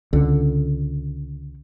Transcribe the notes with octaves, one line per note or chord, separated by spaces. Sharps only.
C#2 D3